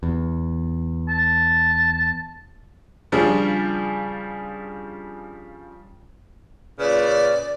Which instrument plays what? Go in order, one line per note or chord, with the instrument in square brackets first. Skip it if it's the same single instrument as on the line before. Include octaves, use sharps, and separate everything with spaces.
[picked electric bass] E2
[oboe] A5
[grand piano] C#3 F3 G3 D4 F4 G#4
[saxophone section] A#2 C#3 B4 [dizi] D5